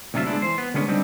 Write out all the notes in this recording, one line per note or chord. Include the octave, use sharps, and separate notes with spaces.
D2 C3 F#3 F4 E5
G#3 B3 C#4 D4 E4 A4
E3 C5
B3
D3 G#3 A#3 B3 C#4
G3 B3 C4 D4 D#4